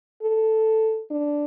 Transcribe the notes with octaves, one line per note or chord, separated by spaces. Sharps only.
A4
D4